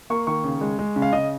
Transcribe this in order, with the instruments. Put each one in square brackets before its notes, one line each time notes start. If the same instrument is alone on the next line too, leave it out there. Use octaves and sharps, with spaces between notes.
[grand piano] A#3 C#6
D#3 C#6
C#3
G#3
G#3
C#3
F5
C#3 D#5